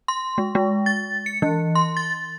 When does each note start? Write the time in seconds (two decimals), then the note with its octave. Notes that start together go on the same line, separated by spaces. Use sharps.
0.08 C6
0.38 G#3
0.55 G#3
0.86 A6
1.26 C#7
1.42 E3
1.75 C6
1.97 A6